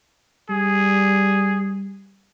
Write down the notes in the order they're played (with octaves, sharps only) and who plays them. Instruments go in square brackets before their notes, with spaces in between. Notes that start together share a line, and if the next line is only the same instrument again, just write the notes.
[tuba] G3 [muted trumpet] G#4